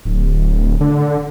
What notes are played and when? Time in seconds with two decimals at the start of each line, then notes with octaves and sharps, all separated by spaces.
0.05 D1
0.81 D3